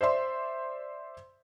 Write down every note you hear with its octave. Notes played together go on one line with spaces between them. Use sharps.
C5 D5 E5 C6